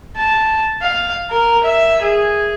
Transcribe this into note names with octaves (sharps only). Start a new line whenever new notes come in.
A5
F5
A#4
E5
G#4